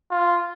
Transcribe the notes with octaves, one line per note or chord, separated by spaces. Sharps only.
F4